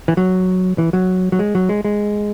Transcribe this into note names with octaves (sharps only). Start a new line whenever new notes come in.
E3
F#3
E3
F#3
F#3
G#3
F#3
G#3
G#3